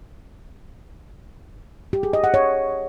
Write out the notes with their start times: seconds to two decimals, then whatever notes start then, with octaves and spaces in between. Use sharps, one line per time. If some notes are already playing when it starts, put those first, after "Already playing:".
1.93 G4
2.03 G#4
2.13 D#5
2.24 F#5
2.34 C#5